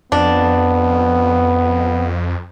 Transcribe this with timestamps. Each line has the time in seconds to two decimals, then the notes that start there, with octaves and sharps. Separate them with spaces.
0.12 F2 B3 D4